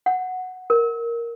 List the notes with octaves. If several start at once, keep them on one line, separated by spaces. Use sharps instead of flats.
F#5
A#4